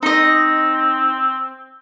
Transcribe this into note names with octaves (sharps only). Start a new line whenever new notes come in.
C4 D#4 D#5